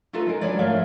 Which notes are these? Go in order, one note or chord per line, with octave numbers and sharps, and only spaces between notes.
A3 D#4 F4 A4 B4 E5
G#3 A#4
F#3 G#3 D4 B4 C#5 D5
G#2 F3 A3 A#4 E5 F5